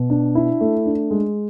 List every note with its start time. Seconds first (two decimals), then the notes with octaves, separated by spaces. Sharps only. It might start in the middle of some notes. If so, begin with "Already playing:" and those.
Already playing: B2
0.10 D4
0.35 E4
0.61 A3
0.86 D4
1.11 G#3